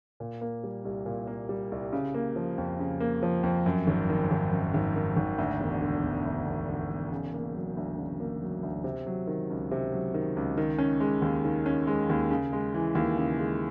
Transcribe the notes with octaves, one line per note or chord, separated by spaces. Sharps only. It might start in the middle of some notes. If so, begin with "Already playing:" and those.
A#2
A#3
G3
C2
A#2
A#3
G3
C2
C#3
A#3
F3
F2
C#3
A#3
F3
F2
F#2
G#1
D#3
G#1
F#2
G#1
D#3
G#1
D2
E1
D3
E1
D2
E1
D3
E1
C#3
A#3
F#3
D2
C#3
A#3
F#3
D2
C3
F#3
D#3
C#2
C3
F#3
D#3
C#2
D#3
C#4
G#3
D#2
D#3
C#4
G#3
D#2
C#3
G#3
E3
D#2
C#3
G#3